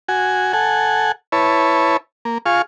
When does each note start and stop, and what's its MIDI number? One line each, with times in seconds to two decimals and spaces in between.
0.08 0.53 66
0.08 0.53 80
0.53 1.12 69
0.53 1.12 78
0.53 1.12 80
1.32 1.97 64
1.32 1.97 71
1.32 1.97 73
1.32 1.97 81
2.25 2.38 58
2.46 2.62 65
2.46 2.62 68
2.46 2.62 77
2.46 2.62 85